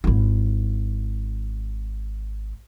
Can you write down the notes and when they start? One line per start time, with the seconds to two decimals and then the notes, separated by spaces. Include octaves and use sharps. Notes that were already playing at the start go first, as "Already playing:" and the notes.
0.04 G#1 E4